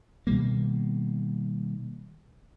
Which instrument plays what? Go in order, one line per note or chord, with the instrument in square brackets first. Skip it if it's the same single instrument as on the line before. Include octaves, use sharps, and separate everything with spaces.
[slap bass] B2 D#3 G3 A#3